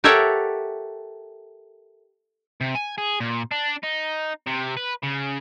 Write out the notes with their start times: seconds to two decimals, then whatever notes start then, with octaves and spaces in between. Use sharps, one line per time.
0.04 G4 A4 A#4 C#5 E5 F#5
2.61 C3
2.75 G#5
2.98 G#4
3.20 A#2
3.51 D4
3.83 D#4
4.47 C3
4.77 B4
5.03 C#3